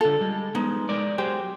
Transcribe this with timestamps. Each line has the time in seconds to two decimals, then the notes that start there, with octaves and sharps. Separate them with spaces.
0.01 D3 F4 A4
0.21 G3 G#3
0.55 G#3 B3 D#4
0.89 G#3 A#4 D5
1.18 F#3 G4 G#4 C5